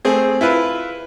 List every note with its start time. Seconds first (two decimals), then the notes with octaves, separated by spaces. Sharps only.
0.05 A3 C4 G#4
0.41 E4 F4 B4